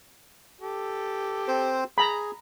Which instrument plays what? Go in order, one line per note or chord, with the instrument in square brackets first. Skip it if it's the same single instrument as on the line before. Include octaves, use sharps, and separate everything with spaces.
[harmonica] G4 A4
[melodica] C4 C5
[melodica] G#4 [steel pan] A#5 B5